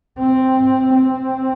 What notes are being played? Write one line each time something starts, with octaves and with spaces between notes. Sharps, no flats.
C4
C4